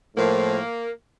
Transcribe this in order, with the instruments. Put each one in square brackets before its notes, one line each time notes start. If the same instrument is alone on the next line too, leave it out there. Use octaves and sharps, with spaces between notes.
[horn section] A2 F3 A#3